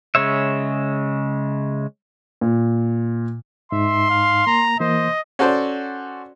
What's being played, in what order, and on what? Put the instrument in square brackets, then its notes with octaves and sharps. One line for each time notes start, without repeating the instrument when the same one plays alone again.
[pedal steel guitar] C#3 G#3 C#5 E5
[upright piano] A#2
[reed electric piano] G#2 D#4 [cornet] E5 [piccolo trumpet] C6
[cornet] F5
[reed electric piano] A#3 [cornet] A#5
[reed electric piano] E3 A#3 [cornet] C5 [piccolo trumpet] D#5
[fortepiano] C#4 F#4 A4 C5 D5